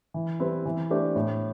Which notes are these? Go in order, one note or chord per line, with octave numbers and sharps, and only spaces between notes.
E3
G3 C4 E4 B4
E3
A3 D4 G4 C5
A2